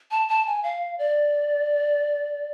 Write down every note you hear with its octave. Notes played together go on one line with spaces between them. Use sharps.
A5
A5
G#5
F5
D5